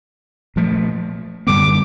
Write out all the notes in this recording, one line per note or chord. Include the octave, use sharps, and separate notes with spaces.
A#2 F3 A3
F#2 D3 G3 B3 D6